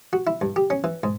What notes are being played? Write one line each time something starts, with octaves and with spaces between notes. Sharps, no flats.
F#4
E4
G2
G4
C#4
E3
G#2